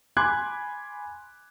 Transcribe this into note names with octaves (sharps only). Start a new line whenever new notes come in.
G#5 B5 C6 D6 F#6 G#6